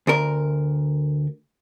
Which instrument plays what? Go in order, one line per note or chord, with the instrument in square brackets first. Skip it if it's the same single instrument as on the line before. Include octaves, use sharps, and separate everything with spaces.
[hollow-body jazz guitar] D2 A#4